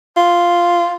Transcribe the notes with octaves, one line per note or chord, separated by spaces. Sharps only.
F4